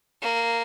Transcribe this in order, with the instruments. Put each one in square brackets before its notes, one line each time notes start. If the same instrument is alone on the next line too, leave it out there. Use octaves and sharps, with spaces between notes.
[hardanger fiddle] A#3